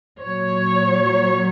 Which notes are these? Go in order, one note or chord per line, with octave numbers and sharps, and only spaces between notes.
A#2 F#3 C#5